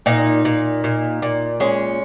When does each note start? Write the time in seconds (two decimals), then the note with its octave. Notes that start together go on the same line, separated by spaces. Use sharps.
0.06 A#2 D#4
0.45 A#2
0.84 A#2
1.22 A#2
1.60 G#3 C#4